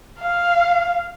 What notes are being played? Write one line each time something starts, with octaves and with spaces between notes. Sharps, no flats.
F5